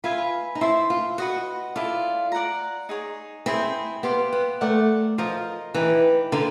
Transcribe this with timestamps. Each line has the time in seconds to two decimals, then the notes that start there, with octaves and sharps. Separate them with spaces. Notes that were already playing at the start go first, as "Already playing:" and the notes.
0.04 F4 B4 E5 G#5 B5
0.55 D#4
0.61 E4 C5 E5 A5 C6
0.90 F4
1.18 F#4 B4 D#5 F#5
1.75 E4 F4 A4 D5
2.32 D5 F#5 A#5
2.89 D#4 G#4 C#5
3.46 C4 E4 G#4 C5
4.03 B3 G4 C5 F5
4.33 B3
4.61 A3 A#4 D5 F#5
5.18 F3 F4 A#4 D#5
5.74 E3 D#4 G4 B4
6.32 D3 F4 A#4 D5 G5